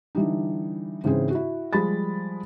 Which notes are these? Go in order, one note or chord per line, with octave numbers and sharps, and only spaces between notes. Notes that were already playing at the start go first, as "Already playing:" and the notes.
D3 E3 G3 D#4
G#2 C#3 E3 C4 G#4
E4 F#4
F3 G3 G#3 B5 A6